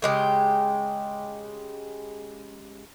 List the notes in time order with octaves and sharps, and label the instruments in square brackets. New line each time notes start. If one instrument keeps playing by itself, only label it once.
[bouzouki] C#3 G#3 G4